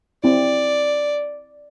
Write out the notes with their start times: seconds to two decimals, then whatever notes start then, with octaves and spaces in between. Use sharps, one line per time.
0.24 C4 E4 D5